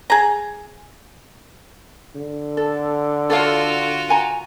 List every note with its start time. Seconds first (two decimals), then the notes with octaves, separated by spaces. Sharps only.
0.10 G#4 A#5
2.15 D3
2.57 A4
3.30 F4 F#4 A4 C#5 F5
4.09 F#5 G#5 A#5